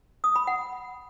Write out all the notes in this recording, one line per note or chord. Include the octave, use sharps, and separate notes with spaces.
D#6
B5
F#5